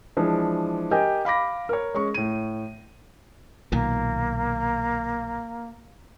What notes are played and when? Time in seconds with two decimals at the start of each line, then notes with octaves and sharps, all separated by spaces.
0.17 E3 F3 G#3 D4
0.91 G4 A#4 D#5 G5 G#5
1.25 F5 B5 D6 A#6
1.69 A#4 C#5
1.94 G#3 C#4 C#6
2.14 A2 D#7
3.72 B1 A#2 D#3 A#3